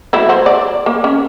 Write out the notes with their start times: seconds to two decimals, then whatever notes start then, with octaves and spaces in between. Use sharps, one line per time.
0.13 F#3 A3 E4
0.29 F#4 C5
0.46 D5
0.86 A#3
1.04 C#4